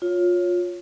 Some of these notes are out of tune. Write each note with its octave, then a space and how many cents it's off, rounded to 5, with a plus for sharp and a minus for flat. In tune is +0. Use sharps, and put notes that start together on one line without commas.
F4 +20 C#5 +0